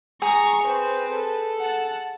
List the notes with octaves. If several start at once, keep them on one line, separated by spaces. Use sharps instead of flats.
G#4 A#5 C#6
C4 B4
A4
F#5 A5